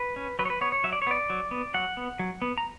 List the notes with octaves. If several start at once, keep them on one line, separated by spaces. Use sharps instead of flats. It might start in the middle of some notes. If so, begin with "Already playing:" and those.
Already playing: B4
C#4
F#3 B4
C#5
B4
B3 C#5
C#5
F#3 E5
D5
C#5
B3 D5
F#3
B3
F#3 F#5
B3
F#3
B3
A#5